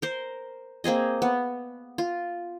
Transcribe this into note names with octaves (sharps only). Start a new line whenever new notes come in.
A#4 C5
A#3 C4 G#4 D#5
B3
F4